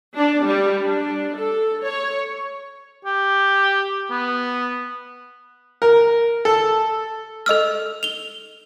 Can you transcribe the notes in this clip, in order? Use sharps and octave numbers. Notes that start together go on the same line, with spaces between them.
D4
G3
D4
A4
C#5
G4
B3
A#4
A4
A4 D#5 E6 F6
F7 G7